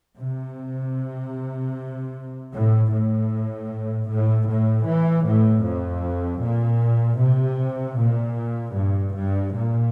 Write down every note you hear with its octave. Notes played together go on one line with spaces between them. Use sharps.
C3
A2
A2
A2
A2
E3
A2
F2
A#2
C3
A#2
G2
G2
A#2